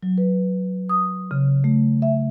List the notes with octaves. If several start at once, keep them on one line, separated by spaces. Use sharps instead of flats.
F#3
B4
D#6
C#3
A3
E5